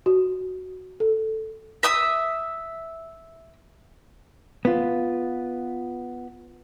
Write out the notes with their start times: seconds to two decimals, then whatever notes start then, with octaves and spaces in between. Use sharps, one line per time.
0.06 F#4
1.00 A4
1.83 E5 D#6 E6
4.65 B3 F4